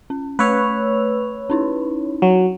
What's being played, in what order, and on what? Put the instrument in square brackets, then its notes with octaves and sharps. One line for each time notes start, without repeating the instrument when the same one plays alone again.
[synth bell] C#4
[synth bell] A3 E6 F7 [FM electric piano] B4 C#5
[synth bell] C#4 D#4 E4
[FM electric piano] F#3